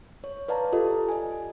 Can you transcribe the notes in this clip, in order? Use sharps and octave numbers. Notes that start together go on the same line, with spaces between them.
C#5
B4 D5 F5 A5 A#5
F4 G4 A4 D#5
D#5 G#5